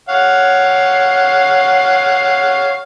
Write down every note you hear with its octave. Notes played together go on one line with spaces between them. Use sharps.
C#5 F5 F#5